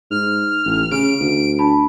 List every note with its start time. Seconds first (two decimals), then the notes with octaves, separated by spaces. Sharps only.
0.11 G#2 F6
0.65 A1
0.92 C#3 D7
1.20 D2
1.59 D4 A5 B5